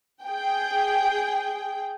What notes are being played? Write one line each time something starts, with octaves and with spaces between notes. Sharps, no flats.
G#4 G5